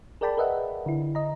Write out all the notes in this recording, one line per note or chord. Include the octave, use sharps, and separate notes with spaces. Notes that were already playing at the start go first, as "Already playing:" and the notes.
G#4 A#4 D5 G5 A5 B5
A#4 B4 D#5 E5 F#5
D3 E4
D#5 A#5